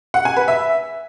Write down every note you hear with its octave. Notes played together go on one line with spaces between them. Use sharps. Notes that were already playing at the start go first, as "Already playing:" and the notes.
F#5
G#5
B4
E5